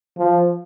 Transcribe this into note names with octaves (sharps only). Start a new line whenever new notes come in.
F3